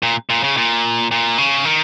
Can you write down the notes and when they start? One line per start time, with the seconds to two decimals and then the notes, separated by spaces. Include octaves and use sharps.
0.03 A#2
0.30 A#2
0.43 C#3
0.57 A#2
1.11 A#2
1.38 C#3
1.65 D#3